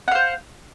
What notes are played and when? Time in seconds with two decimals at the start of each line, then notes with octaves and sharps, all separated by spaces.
0.08 F#5
0.11 F5
0.15 C5